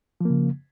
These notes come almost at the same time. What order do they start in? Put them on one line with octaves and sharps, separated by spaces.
F3 A#3 C#3